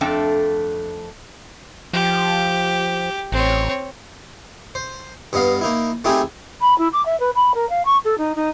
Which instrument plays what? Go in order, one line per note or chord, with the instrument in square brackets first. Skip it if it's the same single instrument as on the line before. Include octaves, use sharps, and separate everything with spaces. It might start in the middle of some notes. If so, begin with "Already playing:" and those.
[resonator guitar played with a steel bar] F2 A3 D4 A4 G5
[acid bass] F3 [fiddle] G4
[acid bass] A1 [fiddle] C4 C#5
[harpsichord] C5
G2 B3 D#5 F5
A#3 D#4 E4
A3 C4 D#4 E4 G4 G#4
[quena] B5
E4
D6
E5
B4
B5
A#4
F5
C#6
A4
D#4
D#4